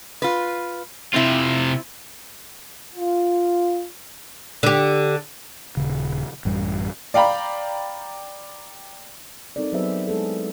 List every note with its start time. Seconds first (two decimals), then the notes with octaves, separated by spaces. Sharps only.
0.22 F4 B4
1.14 C3 C4 E4 F4
2.95 F4
4.63 D3 G4
5.77 D#1 C#3
6.45 A1 F#2 G3
7.14 D5 F5 G5 A#5 B5
9.56 G3 C4 D#4 A4 A#4 D5
9.72 F#3 B3 G#4 B4 C5 E5
10.08 G#3 E4 G#4 A4